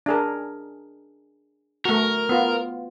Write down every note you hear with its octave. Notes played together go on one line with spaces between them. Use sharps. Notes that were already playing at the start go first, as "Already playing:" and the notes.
D4 G#4 A#4
A3 F#4 A#4
B3 F4